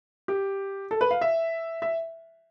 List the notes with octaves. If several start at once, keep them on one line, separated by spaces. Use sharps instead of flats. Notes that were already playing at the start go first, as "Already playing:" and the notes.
G4
A4
B4
F5
E5
E5